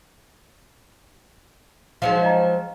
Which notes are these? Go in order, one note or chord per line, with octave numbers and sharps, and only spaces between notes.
F3 F#3 G#3 D#4 C5 F5
D#5 G5 A#5